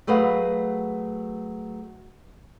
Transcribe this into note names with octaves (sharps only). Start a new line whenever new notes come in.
F#3 A3 G#4 B4 F5 F#5